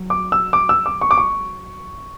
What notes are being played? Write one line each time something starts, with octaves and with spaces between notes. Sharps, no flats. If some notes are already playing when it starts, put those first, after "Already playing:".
Already playing: F#3
D6
E6
D6
E6
D6
C#6
D6
C#6